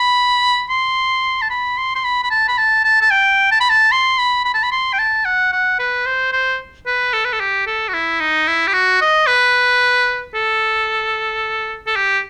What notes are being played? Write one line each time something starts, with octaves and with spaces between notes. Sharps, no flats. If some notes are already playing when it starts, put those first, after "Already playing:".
Already playing: B5
C6
A5
B5
C6
C6
B5
B5
A5
B5
A5
A5
A5
G5
A5
B5
A5
C6
B5
B5
A5
B5
C6
G5
A5
F#5
F#5
B4
C5
C5
B4
A4
B4
A4
G4
A4
F#4
E4
D#4
E4
G4
F#4
D#5
B4
A4
A4
G4